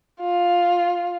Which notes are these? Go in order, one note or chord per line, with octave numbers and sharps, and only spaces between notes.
F4